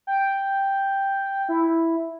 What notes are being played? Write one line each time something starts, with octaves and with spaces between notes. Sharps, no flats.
G5
E4